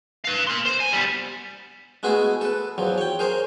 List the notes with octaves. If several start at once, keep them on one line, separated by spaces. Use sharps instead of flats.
B4 F5
A#4 C6
C5
G#5
G3 B3
G#3 A3 B3 E4 F#4 G#4
A4 B4
E2 F3 F#3
C#5 G5
G#4 A#4 C5 C#5